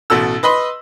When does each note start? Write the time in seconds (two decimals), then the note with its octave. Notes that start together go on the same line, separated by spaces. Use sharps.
0.10 A1 B2 A4 E6
0.43 B4 D#5 B5 C6